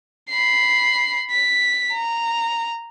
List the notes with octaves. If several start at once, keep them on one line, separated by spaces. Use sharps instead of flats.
B5 C7
B6
A#5